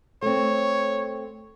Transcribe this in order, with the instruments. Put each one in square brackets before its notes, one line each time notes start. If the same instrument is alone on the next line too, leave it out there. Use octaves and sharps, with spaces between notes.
[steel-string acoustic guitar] A3 C4 [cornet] C#5